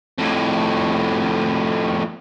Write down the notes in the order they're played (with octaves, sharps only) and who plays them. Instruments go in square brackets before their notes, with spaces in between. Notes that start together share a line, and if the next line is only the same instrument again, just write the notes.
[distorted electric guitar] F2 A2